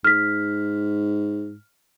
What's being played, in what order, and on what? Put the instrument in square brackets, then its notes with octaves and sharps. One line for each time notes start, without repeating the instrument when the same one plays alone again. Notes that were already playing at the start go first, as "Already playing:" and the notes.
[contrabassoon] G#2 [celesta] F6 B6